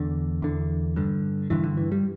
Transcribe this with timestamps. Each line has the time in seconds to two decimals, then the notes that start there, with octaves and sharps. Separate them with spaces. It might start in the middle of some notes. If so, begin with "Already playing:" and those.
Already playing: E2 D3
0.42 E2 D3
0.96 G2 D3
1.50 G2 D3 E3
1.64 D3
1.77 E3
1.92 G3